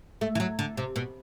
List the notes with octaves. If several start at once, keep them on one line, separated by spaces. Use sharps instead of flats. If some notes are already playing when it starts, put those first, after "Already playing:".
A3
E3
F#3
D3
C3
B2